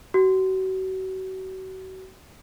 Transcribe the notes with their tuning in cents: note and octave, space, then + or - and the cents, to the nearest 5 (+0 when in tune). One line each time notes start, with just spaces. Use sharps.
F#4 +35